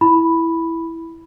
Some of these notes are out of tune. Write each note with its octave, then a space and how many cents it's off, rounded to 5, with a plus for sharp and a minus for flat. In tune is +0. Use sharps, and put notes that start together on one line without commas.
E4 +0 B5 +0